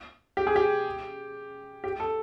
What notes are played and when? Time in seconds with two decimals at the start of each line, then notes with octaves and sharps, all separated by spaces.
0.37 G4
0.47 G#4
0.56 G4
1.84 G4
2.00 A4